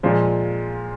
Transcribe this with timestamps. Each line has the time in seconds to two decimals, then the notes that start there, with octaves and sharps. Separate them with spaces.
0.03 A#2 F3 G#3